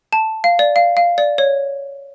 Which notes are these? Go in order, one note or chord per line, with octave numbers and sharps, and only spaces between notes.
A5
F5
D5
F5
F5
D5
C#5